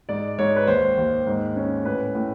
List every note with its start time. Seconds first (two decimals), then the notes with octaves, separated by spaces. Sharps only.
0.09 G#2 D5
0.38 G#2 C#5
0.56 B4
0.67 D#2 C5
0.97 D#2
1.27 G#2
1.56 C#4
1.85 A2 B4
2.15 A2